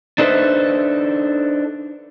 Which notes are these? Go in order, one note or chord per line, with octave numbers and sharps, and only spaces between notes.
D4 D#4 A4 B4 C5 E5